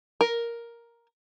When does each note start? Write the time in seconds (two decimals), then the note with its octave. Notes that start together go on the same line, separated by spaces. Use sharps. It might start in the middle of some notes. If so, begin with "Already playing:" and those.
0.21 A#4